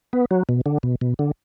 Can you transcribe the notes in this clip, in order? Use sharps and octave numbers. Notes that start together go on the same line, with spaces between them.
B3
F#3
B2
D3
B2
B2
D3